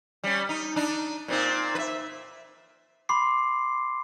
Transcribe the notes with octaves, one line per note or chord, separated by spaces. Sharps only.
G3 C#4
D#4
D4 D#4
A#2 C4 D#4
B4 E5
B5 C6 D6 C7